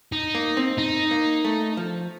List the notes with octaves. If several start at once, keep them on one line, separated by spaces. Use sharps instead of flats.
D#4
A#3
C4
D#4
A#3
A3
F3